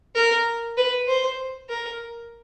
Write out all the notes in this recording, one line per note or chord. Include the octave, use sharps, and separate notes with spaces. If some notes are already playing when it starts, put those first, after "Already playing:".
A#4
B4
C5
A#4